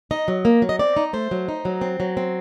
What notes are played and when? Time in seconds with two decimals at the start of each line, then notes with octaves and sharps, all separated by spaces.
0.11 D#4 D#5
0.28 F#3
0.45 A#3
0.62 F#3
0.69 D#5
0.79 C4 D5
0.97 D#4
1.13 A3 C5
1.31 F#3
1.48 D#4
1.65 F#3
1.81 C4
2.00 F#3
2.17 C4